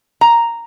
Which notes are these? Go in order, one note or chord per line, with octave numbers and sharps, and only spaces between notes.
A#5